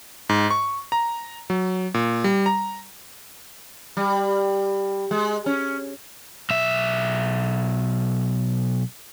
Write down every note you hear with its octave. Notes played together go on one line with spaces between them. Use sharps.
G#2
C#6
A#5
F#3
A#2
G3
A#5
G3
G#3
C#4
B1 E5